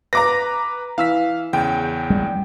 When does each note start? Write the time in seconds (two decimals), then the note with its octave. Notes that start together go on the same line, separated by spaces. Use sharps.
0.13 B4 A#5 D6 A#6
0.98 E3 F5 E6 B6
1.53 E2 C#3 G5
2.10 G3